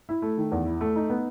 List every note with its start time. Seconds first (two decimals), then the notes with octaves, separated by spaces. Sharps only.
0.09 E4
0.22 A3
0.38 D#3
0.52 E2
0.66 E4
0.81 A3
0.96 D#4
1.10 B3